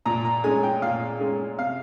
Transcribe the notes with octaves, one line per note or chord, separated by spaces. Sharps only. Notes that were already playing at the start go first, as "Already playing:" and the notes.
A#2 A#5
A#5
G#3 C#4 G#5
G5
A#2 F5
G#3 C#4
C3 F5